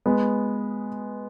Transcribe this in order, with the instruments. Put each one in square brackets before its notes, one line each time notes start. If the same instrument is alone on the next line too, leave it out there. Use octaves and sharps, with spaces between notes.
[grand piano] G#3 B3